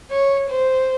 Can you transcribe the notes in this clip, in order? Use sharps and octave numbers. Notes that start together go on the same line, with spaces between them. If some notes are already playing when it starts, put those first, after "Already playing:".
C#5
C5